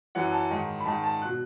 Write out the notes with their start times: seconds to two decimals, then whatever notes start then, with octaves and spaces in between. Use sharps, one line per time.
0.15 F#2 E3 F#5
0.32 A5
0.51 G#2 D#3
0.80 B5
0.85 G#2 D#3 A5
1.04 A5
1.22 B2 F#6